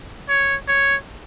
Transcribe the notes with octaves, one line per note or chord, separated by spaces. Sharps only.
C#5
C#5